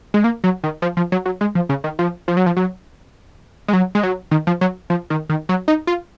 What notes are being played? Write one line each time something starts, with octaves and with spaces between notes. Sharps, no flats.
G#3
A#3
F#3
D#3
F3
F3
F#3
F#3
G#3
F3
C#3
D#3
F3
F3
F#3
F3
F#3
G#3
F#3
G#3
F#3
D#3
F3
F#3
F3
D#3
D#3
F#3
D#4
F4